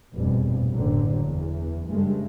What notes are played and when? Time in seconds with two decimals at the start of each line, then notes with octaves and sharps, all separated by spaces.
0.15 F1 A#1 E2 G2 B2
0.73 F#1 A2 D3 F#3
1.23 E2
1.87 G2 C#3 G#3 A3